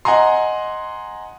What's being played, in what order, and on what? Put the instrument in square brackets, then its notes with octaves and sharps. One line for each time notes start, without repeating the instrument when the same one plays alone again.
[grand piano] D#5 F#5 G#5 A#5 C6